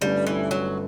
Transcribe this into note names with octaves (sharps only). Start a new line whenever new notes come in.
G1 G2 D3 G3 A3 C#4
E3
F#3